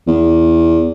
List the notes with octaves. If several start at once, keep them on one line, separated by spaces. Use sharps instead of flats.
E2